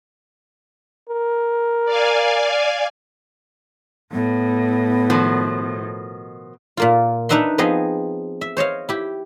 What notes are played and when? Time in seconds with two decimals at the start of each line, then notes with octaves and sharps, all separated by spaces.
1.09 A#4
1.86 D5 F5 G#5
4.12 A2 B3
5.10 B2 D#3 F3
6.77 A#2 A#3 F4
7.29 D4 D#4 B4 E5 F#5 C6
7.58 F3 B3 C4 G#4 C5 D#5
8.41 E5
8.57 C5 C#5 D#5 F5
8.89 E4 G4